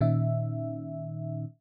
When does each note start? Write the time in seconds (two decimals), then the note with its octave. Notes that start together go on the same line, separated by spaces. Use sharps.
0.01 A#2 D#3 C#4 D#4 E5